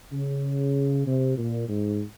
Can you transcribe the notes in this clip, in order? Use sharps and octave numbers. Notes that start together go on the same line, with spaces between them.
C#3
C3
A#2
G#2